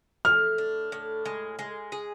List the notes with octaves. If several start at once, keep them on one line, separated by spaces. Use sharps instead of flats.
A2 F6
D4
A2
G#3
G#3
G#4